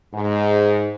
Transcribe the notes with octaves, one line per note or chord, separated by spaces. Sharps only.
G#2